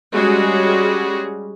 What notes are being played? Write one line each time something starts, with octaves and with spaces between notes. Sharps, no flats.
G3 G#3 C#4 F#4 G#4